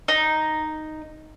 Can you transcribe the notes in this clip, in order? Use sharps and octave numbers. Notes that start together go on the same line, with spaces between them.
D#4